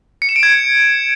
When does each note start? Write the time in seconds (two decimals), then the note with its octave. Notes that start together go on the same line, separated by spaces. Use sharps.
0.22 C#7
0.29 E7
0.36 D7
0.43 G#6